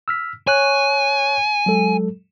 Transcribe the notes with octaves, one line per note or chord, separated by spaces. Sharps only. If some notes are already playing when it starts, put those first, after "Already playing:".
E6 F6 B6
C#5 G#5 C#6 F#6
F#3 G#3 A4